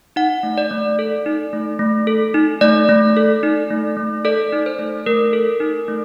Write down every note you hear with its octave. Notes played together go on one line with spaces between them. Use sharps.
D#4 F#5
A3
D5
A3
A4
D#4
A3
A3
A4
D#4
A3 D5
A3
A4
D#4
A3
A3
A4 D5
D#4
C5
A3
A3 A#4
A4
D#4
A3